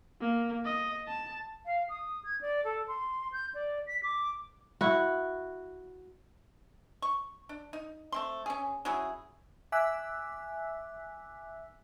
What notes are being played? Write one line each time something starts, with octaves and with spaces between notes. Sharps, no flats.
A#3
D#5
A5
F5
D#6
G#6
D5
A4
C6
G6
D5
B6
D6
E4 F#4
C#6
D4
D#4
A3 C4 C6
C#4 G#4
F#3 C#4 E4 G#4
E5 G#5 D6 E6 F#6 B6